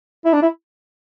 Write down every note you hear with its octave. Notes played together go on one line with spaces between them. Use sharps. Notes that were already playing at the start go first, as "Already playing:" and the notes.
E4
D4
E4